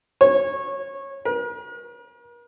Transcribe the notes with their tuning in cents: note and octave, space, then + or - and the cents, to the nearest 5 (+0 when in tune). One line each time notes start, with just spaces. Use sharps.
C#5 -20
A#4 +45